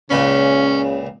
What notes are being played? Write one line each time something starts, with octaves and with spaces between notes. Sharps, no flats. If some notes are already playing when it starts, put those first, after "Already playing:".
C#2 A#2 C#3 C#4 B5